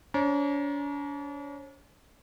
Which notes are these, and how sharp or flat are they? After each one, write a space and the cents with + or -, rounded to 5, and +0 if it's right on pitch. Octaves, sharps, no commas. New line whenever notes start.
D4 -45 C#5 -45 A#5 +20